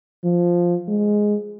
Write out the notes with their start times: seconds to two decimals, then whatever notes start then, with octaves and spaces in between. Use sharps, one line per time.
0.24 F3
0.88 G#3